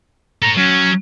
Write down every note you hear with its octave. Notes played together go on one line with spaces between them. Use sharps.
A4 C#5 A#5
F#3 C#4